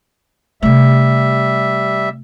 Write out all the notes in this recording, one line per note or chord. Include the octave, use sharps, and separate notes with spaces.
C3 G3 A3 E5